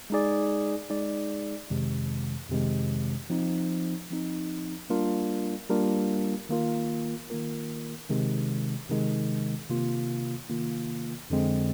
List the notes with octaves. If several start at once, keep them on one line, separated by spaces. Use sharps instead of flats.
G#3 D#4 G#4 D5
G#3 D#4 G#4 D5
F2 C3 D#3 G#3
F2 C3 D#3 G#3
F3 C4 D#4
F3 C4 D#4
G3 A#3 D4 F4 A#4
G3 A#3 D4 F4 A#4
D#3 A#3 F4 A#4
D#3 A#3 F4 A#4
C3 D#3 G#3
C3 D#3 G#3
C3 D#3 A#3 F4
C3 D#3 A#3 F4
F2 D3 G#3 C4